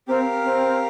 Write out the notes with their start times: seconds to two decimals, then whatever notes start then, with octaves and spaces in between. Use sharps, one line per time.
0.07 C4 G4 A#4 F5
0.43 C4